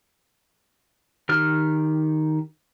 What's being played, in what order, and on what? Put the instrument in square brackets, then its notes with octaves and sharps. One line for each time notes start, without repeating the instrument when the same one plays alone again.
[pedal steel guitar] D#3 G4 F6